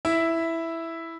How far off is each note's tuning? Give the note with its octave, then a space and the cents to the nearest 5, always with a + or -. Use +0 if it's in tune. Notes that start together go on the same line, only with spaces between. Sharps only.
E4 +0 E5 +0